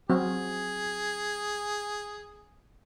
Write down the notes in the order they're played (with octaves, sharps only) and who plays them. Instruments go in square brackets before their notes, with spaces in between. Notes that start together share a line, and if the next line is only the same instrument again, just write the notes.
[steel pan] F#3 C4 F#4 [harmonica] G#4